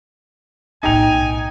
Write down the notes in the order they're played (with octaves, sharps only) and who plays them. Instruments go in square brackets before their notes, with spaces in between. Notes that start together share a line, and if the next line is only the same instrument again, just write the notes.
[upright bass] B1 A2 [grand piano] D#4 G5 F7 [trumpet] G#5